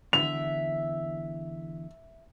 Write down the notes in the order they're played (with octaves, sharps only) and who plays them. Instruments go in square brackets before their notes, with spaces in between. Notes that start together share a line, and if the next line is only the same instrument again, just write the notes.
[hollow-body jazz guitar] E2 D3 [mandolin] E5 [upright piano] F7